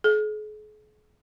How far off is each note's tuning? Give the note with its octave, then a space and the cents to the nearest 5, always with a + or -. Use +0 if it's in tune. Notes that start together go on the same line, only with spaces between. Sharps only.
G#4 +45